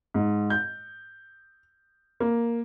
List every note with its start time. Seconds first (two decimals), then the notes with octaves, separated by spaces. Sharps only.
0.14 G#2
0.50 G6
2.20 A#3